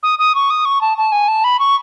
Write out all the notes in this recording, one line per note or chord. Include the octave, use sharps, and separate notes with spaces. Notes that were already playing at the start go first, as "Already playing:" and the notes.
D#6
D#6
C#6
D#6
C#6
A5
A5
G#5
A5
B5
C#6